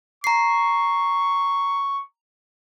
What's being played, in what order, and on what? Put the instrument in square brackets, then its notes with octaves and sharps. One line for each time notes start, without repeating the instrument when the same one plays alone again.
[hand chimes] A#5 C7 [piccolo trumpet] C#6